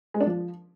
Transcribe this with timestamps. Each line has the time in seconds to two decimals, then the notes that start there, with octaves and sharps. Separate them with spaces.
0.14 G#3
0.21 D4
0.27 F3